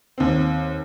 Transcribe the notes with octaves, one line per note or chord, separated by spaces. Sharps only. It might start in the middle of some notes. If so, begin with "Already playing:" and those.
D#2 C4